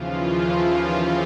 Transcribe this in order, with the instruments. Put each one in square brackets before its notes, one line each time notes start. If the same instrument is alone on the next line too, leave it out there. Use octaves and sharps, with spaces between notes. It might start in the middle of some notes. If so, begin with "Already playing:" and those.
Already playing: [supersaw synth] D#2 C#3 E3 F3 F4